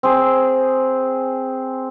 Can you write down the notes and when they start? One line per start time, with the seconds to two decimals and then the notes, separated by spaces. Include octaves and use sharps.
0.03 C4 G#4